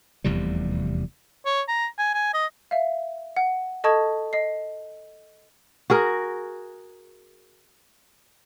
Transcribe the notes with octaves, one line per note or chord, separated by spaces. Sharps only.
F1 E2 C3 G3
C#5
A#5
G#5
G#5
D#5
E5 F5
F#5
A4 D#5 A5 C#6 D#6 G#6
D#5 C7
F#4 G#4 A#4